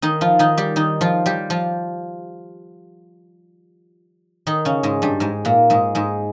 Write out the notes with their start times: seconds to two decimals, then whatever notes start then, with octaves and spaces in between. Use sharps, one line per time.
0.02 D#3 D#4
0.21 F3 F4
0.39 D#3 D#4
0.57 G3 G4
0.76 D#3 D#4
1.01 F3 F4
1.26 G3 G4
1.50 F3 F4
4.47 D#3 D#4
4.65 C#3 C#4
4.83 G#2 G#3
5.02 G2 G3
5.20 G#2 G#3
5.45 A#2 A#3
5.70 G#2 G#3
5.95 G#2 G#3